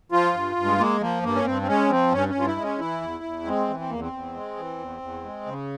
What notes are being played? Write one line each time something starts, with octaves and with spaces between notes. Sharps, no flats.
F3 F4
G2
G2
G#3
G#3 A#3
F3 A#3
G2 A#3
C#4
G2 C4
C4
G#3 C#4
F3 C4
G2 C#4
C#4
G2 F4
E4
G#3
C#4
E3 E4
E2
E2
G#3 C4
E3
C4
E2 A#3
C4
E2
G#3
E3
E2
E2
G#3
C#3